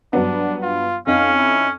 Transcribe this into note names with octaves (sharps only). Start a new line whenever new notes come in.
G2 F#3 B3 D4
F4
F2 C#4 D#4 F5
E4